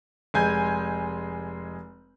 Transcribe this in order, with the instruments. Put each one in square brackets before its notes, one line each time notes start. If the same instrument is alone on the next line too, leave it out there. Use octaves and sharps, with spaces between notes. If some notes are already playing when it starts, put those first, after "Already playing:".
[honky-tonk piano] F1 G#3 G#5 G6